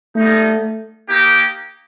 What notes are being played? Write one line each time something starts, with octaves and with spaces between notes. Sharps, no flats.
G3 A3 B3 D#4
A#3 D#4 G4